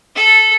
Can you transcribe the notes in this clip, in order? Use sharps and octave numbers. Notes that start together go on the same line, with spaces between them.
A4